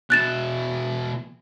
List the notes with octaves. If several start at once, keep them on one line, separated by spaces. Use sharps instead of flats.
B2 E4 F#6 A6 E7